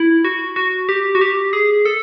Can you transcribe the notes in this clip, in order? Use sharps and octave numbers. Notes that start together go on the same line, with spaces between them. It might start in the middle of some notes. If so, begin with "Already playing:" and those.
Already playing: E4
F#4
F#4
G4
F#4
G4
G#4
A4